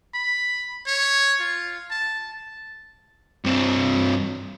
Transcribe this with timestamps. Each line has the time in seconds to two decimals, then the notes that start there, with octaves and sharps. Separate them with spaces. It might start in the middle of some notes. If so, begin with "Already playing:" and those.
0.15 B5
0.86 C#5
1.40 F4
1.90 A5
3.44 G2 C4